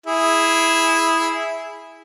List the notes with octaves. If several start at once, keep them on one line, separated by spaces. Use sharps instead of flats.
E4 G#4